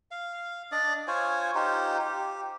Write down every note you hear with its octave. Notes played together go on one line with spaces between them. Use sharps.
F5
D4 D5 D#5
F4 C5 C#5 G#5
D#4 F4 G4 C5
G4